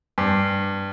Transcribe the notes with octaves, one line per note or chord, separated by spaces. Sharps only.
G2